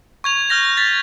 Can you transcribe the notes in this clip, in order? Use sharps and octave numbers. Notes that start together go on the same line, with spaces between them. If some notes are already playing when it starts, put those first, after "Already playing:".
C#6 G#6 F7
F6 G6 A#6 F7
A6 B6 G7